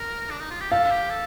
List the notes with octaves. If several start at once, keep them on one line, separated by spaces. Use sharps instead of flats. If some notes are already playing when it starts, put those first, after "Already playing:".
Already playing: A#4
D4
D#4
F4
G4
A4 F5
G4
A4